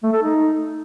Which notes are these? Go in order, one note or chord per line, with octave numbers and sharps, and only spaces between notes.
A3
A4
D#4